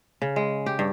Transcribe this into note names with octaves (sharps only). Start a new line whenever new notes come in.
C#3
G#3
G4
G2